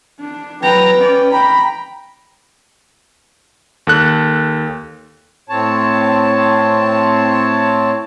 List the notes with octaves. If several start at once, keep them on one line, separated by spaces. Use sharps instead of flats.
D4
F#3 B4 G5 A#5
C#4 D5
G5 A#5 B5
D#2 A4 F#6
A2 C4 C#5 A5